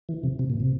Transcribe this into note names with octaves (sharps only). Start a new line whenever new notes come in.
E3
C3
C3
A#2
C3